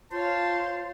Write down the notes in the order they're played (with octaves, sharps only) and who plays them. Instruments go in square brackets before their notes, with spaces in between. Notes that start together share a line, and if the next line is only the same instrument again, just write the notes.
[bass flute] F4 [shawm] C5 [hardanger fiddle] C#5 F5 [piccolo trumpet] A5